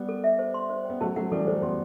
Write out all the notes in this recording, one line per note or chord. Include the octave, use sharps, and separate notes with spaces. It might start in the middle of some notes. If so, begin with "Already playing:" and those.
Already playing: G3 B3
A4
E5
C5
C6
C5
B3 G5
F#3 A3 A5
F#3 A3 F#5
E3 G3 A4
F#3 A3 C5
G3 B3 C6